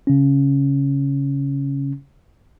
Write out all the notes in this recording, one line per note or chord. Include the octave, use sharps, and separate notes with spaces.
C#3 C#4